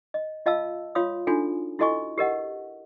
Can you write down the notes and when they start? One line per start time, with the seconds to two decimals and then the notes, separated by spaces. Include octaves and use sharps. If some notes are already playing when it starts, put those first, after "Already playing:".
0.14 D#5
0.46 F4 D#5 F5 A5 E6
0.95 F4 C#5 F5 C6 D#6
1.27 D4 D#4 F4 F#4 A4 G#5
1.79 E4 F#4 A4 D#5 G#5 C#6
2.18 G4 A#4 D#5 F#5